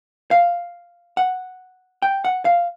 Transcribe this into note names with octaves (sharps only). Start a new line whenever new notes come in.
F5
F#5
G5
F#5
F5